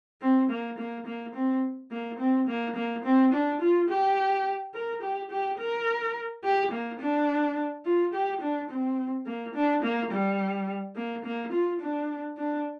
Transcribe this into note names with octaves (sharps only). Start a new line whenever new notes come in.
C4
A#3
A#3
A#3
C4
A#3
C4
A#3
A#3
C4
D4
F4
G4
A#4
G4
G4
A#4
G4
A#3
D4
F4
G4
D4
C4
A#3
D4
A#3
G3
A#3
A#3
F4
D4
D4